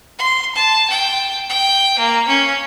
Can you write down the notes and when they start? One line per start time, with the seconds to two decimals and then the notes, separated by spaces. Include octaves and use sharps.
0.19 C6
0.55 A5
0.90 G5
1.50 G5
1.99 A#3
2.28 C#4